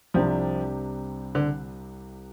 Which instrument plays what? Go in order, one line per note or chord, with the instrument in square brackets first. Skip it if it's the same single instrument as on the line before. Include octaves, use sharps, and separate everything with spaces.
[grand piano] C2 C3 G3 D4 G4 [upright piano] F3
[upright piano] D3